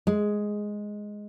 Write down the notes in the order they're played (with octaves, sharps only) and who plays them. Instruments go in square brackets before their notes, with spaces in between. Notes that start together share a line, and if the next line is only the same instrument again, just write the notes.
[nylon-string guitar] G#3